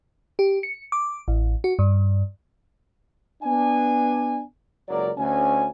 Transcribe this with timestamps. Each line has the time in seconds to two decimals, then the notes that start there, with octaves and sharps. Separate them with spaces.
0.39 G4
0.63 C#7
0.92 D6
1.28 A1
1.64 F#4
1.79 G2
3.43 B3 D4 G#5
4.89 F#1 C#2 F#3 A#4 D5
5.18 D2 C#4 G#5